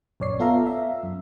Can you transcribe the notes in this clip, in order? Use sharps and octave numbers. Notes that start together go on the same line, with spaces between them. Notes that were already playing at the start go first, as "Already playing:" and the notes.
A#1 F#2 C#5 D5 C7
B3 F4 A4 E5 F5 A#5
E5
F#2